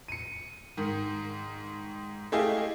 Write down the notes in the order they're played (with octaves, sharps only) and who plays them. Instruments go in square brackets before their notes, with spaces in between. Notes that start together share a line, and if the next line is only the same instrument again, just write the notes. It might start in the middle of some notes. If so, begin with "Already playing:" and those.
[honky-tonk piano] C#7 D#7
G#2 D#3
A3 E4 G4 G#4 D#5 F5